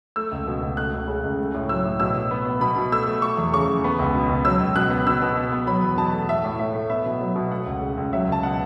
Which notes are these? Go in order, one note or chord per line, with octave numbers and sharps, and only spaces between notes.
A3 E6
C#2
B2
C#2
A3 F#6
C#2
C#3
C#2
A3
A2
F#3 E6
A2
B2 E6
B2
B3
B3
B2 B5
B2
A3 E6
A3
A3 C#6
E2
C#3 C#6
E2
B3
C#2
B2
C#2
F#3 E6
C#2
B2 F#6
B3
B2 E6
B2
B3
B3
F#3 B5
E2
B2 A5
A3
A2 E5
A2
A3 E5
A3
B3 E5
B2
F#3
B2
A3 F#5
C#2
C#3
C#2
F#3 E5
C#2
A5
B2 F#5